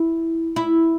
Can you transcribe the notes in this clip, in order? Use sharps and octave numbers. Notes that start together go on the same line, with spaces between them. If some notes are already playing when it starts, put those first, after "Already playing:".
Already playing: E4
E4